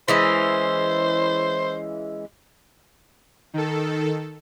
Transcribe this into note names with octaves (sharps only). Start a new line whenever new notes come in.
E3 G#3 C#4 C5
D#3 A4